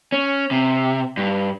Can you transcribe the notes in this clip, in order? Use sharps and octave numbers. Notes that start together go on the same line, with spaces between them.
C#4
C3
G2